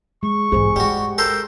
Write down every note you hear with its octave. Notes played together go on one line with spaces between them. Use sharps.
G#3 C#6
G#1 E3 G#4 C5
G3 G#3 F#4
A4 A#4 C5 G5